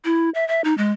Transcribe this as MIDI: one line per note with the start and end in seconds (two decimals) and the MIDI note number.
0.05 0.30 64
0.35 0.47 76
0.48 0.61 76
0.64 0.76 63
0.78 0.92 56